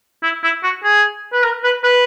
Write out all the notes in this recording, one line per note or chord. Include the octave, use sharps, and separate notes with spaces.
E4
E4
F#4
G#4
B4
A#4
B4
B4